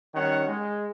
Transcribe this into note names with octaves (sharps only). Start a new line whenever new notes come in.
D#3 G3 C#4 C#5 F#5
G#3